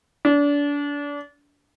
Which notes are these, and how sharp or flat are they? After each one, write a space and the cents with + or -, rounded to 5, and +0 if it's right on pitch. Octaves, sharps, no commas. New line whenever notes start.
D4 -30